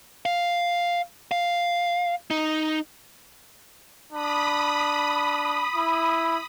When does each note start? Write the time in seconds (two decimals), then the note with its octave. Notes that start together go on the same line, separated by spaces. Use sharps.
0.26 F5
1.31 F5
2.31 D#4
4.12 D4 B5 D#6
5.75 E4